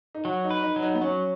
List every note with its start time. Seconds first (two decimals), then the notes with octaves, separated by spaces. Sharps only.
0.15 D#4
0.25 F#3 F#4
0.44 D#4
0.50 B4
0.63 D#4
0.76 F#3
0.83 D#4
0.95 B3
1.02 F#3 C#4